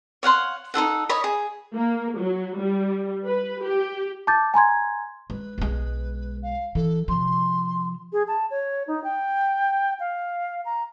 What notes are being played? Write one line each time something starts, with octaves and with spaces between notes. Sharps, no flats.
C#5 F5 F#5 C6
D#4 F4 A4 F#5
C#5 D#5 B5
G#4
A#3
F#3
G3
B4
G4
A5 D6 G6 A6
G#5 A#5 C6 G#6
G#3 B4
B1 G#3
F5
E3 A4
C3 F3 C6
G#4
A5
C#5
D#4
G5
F5
A#5